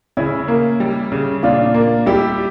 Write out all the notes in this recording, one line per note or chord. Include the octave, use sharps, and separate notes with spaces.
C#3 C#4 E4
A#3
G3
C#3
A#2 D4 F4
A#3
G3 E4 G4